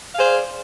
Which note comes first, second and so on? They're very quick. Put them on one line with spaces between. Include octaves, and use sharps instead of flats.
F5 G#4 C5 D5